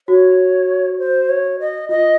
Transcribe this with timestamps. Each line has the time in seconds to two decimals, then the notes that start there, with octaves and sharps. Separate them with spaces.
0.08 F#4 C#5
0.99 C5
1.29 C#5
1.60 D#5
1.89 F4 D#5